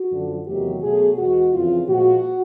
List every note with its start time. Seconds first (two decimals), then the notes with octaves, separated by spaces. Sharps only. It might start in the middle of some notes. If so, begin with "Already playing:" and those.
Already playing: F#4
0.11 F#2 D3 F3
0.47 E2 C3 D#3 F#3 A3 G4
0.83 B2 F#3 A3 G#4
1.18 E2 B2 G#3 F#4
1.54 F2 C#3 E3 F4
1.89 A#2 F3 G#3 F#4